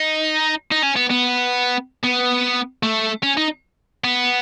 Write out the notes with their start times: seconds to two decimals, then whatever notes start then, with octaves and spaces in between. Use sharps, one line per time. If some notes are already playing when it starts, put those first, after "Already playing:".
Already playing: D#4
0.72 D#4
0.83 C#4
0.96 B3
1.11 B3
2.03 B3
2.83 A3
3.23 C#4
3.37 D#4
4.04 B3